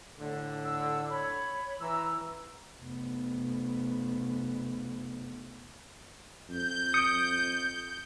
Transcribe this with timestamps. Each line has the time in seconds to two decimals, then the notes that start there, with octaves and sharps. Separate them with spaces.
0.19 A2 D3
0.64 E6
1.09 C#5 B5
1.81 E3 A#5 E6
2.80 F1 B3
6.49 F2 G6
6.94 D#6 C#7 D7